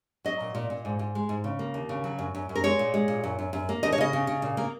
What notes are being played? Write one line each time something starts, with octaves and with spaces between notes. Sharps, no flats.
F#3 D#5
A#2
A#2
A#2
G#2
G#2
G#3
G#2
C#3
A#3
D#2
C#3
F#3
F#2
F#2
F#2
A#4
G#3 C#5
A#2
G#3
A#2
F#2
F#2
F#2
A#3
D#2 D#5
C#5
C#3 D#5
C#3
C#3
A#2
A#3